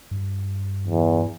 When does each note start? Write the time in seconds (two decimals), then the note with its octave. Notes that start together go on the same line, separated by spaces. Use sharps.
0.11 G2
0.87 E2